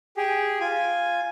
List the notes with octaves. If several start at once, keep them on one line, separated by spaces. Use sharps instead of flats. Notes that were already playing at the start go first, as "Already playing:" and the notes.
G4 G#4
F4 G#5